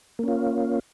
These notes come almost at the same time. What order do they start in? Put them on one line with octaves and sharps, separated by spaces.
A#3 C#4 F4